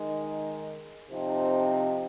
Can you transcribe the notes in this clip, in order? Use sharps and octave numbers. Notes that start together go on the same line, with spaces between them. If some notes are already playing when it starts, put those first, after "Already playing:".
Already playing: D#3 G#3 D#4
C3 F3 C4 D#4